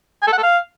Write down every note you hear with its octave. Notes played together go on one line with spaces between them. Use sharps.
G#5
A4
F#5
A4
F5